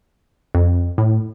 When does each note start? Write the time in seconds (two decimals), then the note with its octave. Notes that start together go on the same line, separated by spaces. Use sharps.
0.55 F2
0.98 A2